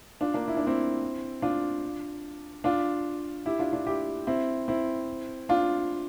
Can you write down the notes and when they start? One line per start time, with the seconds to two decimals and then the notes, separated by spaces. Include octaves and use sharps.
0.21 D4 F4
0.34 A#3 D4
0.48 E4
0.57 D4
0.67 C4 E4
1.42 D4 F4
2.64 D4 F4
3.46 E4 G4
3.59 D4 F4
3.73 D4 F4
3.86 E4 G4
4.27 C4 E4
4.68 C4 E4
5.49 D4 F4